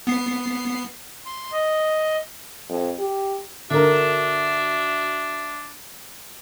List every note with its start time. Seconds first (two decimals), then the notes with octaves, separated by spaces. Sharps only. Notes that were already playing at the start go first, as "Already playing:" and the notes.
0.07 B3 C7
1.26 C6
1.52 D#5
2.69 F2
2.99 G4
3.71 D3 D4 F#4 A#4 E5